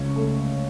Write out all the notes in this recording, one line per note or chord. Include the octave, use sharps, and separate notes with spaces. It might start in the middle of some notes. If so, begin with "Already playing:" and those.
Already playing: C#2 C#5
A3